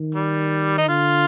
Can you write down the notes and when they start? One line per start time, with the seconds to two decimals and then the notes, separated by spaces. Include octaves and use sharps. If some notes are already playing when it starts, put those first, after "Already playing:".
Already playing: D#3
0.15 G3
0.78 D#4
0.88 D3 F4